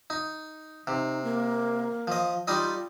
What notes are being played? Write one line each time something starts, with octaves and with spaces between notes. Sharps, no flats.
D#4
C3 D#4
A#3
F3 D#5
G3 D#4 F4 D#5